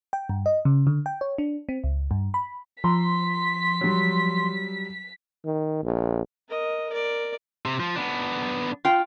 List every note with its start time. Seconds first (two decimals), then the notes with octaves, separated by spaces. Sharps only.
0.13 G5
0.29 G2
0.46 D#5
0.65 C#3
0.87 D3
1.06 G5
1.21 C#5
1.38 D4
1.69 C4
1.84 C#2
2.11 G2
2.34 B5
2.84 F3 A#5 C6 B6
3.81 F#3 G3
5.45 D#3
5.83 A#1
6.48 A#4 D#5
6.90 A#4 D5
7.66 C3
7.80 F3
7.96 B3 D4
8.85 F4 G5